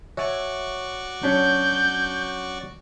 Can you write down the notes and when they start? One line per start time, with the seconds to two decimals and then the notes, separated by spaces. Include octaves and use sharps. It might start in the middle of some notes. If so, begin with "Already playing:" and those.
0.17 F#4 C#5 D5 E5 G#5 C#6
1.23 F#3 C#4 D4 G6